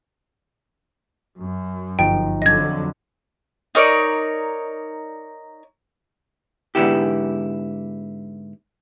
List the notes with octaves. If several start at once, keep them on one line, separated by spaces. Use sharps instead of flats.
F#2
G1 F3 D#4 G5
F2 D3 F#3 D#5 G#6
D#4 A#4 C#5 D5
G#2 D3 B3 E4 G4